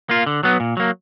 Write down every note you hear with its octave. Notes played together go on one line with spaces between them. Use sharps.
A#3 F4
D3
F#3 B3
A#2
F#3 A#3